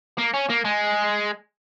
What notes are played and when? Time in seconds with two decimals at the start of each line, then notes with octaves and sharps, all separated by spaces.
0.18 A#3
0.34 C#4
0.50 A#3
0.65 G#3